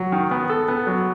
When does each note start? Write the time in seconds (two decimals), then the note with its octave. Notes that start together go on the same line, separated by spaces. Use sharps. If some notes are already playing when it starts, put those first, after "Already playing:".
Already playing: F#3
0.12 D#3
0.31 B3
0.49 A4
0.68 B3
0.87 F#3